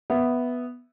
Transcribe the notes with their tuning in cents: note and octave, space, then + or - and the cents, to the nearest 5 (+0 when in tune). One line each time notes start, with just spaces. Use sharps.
B3 +0 E5 +0